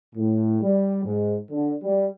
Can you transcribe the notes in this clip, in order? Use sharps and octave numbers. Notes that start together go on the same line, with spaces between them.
A2
G3
G#2
D3
G3